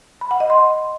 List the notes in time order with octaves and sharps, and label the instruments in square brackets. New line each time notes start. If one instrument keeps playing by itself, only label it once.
[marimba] B5
F#5
D#5
C6